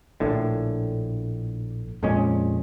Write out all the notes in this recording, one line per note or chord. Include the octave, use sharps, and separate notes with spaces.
A#1 A2 D3
F2 A#2 G#3 C#4